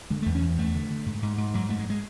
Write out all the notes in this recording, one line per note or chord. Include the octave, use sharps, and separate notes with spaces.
D3 G#3
A3
E2
C#4
E2
E2 A3
D3
D3
G#2
G#2
G#2
G#2 F#3
G#2 A3
G#3
G#3